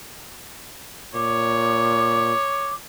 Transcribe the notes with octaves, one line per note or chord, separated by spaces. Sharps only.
A#2 C#5 D6